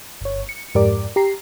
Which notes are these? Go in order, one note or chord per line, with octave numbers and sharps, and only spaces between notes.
G1 C#5
C#7
F2 G#2 G4 A#4 D5 D6
G4 A#5 C7